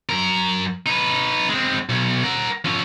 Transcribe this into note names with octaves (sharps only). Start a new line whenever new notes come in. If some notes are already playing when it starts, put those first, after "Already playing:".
F#2 A#4
D#4 B4
G#3 C4
B1
A#4 F#5
F3 C#4